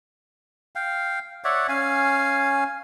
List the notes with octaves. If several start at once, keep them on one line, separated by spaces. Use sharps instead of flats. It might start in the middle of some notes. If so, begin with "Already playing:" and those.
F5 G5
C#5 D5 E5 F#5
C#4 F5 G#5